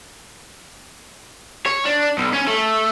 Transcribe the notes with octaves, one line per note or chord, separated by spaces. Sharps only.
C#5
D4
B1
C#4
A3